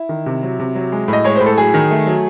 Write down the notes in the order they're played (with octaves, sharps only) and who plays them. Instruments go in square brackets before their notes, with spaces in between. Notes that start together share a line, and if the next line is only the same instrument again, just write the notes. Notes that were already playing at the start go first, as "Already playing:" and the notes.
Already playing: [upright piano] E4
D#3
C3
F#3
C3
F#3
G#3
A2
D#5
G#3 C#5
A2 C5
A4
F#3 G#4
D#3
A3
F#3